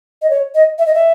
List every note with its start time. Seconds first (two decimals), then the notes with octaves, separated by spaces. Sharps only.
0.22 D#5
0.30 C#5
0.54 D#5
0.78 E5
0.86 D#5
0.94 E5